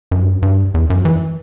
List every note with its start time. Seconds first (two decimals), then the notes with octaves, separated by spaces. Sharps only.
0.11 F#2
0.22 G2
0.30 F#2
0.42 G2
0.74 E2
0.90 F#2
1.05 E3